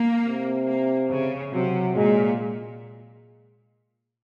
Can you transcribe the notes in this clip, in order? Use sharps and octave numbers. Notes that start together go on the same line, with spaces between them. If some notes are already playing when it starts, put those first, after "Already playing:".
Already playing: A#3
C3
A#3
C#3
C3 F#3
A#2 G#3